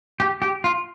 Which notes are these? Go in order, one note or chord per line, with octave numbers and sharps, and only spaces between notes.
G4
G4
F4